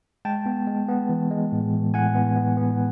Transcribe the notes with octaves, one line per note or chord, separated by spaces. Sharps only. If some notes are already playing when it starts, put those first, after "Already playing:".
G#3 G5 A5
B3
G#3
B3
E3
G#3
A2
E3
A2 F#5 G#5
B3
B3
B3